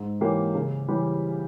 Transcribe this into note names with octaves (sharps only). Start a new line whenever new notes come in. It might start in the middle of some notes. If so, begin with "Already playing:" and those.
Already playing: G#2
E3 A#3 C#4 G4
C#3
E3 G3 C#4 G4